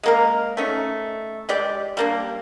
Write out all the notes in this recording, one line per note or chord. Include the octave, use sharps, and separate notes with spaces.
G#3 A#3 A#4
A3 C#4 D#4
G#3 G4 D5
G3 A#3 D4